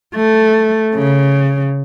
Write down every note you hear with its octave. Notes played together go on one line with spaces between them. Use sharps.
A3
C#3